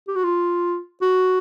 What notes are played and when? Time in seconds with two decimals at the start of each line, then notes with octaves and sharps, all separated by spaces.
0.08 G4
0.15 F#4
0.23 F4
1.01 F#4